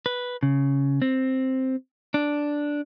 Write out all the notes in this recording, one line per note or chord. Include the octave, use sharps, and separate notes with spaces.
B4
C#3
C4
D4